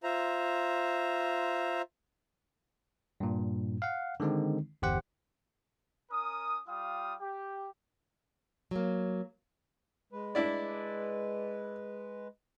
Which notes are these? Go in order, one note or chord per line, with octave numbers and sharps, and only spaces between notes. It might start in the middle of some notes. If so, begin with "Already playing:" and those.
F4 C5 E5 A#5
G2 A#2
F5 F#5
D3 D#3 G#3 C4 D#4
G1 E2 G4 C5 F#5
C#4 A#4 D#6
G3 F4 F5 G5 D#6
G4
F#3 A#3
G#3 B4
D4 E4 D5